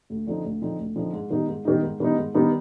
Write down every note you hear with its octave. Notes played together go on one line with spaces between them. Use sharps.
D2
D3 F3 C4 D#4
D2
D3 F3 C4 D#4
D2
D3 F3 C4 D#4
G#2
D#3 G3 B3 D#4
G#2
D#3 G3 B3 D#4
G#2
D#3 G3 B3 D#4
G#2
D#3 G3 B3 D#4